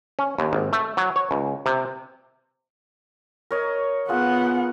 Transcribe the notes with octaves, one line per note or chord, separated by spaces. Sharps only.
C#4
D#2
G#1
A3
F#3
C#5
C#2
C3
A#4 C#5 D#5
B3 F4 G#4 F#5